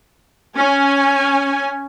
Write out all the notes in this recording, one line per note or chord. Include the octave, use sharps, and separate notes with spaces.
C#4 G#5